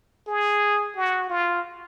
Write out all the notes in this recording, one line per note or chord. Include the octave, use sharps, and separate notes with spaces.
G#4
F#4
F4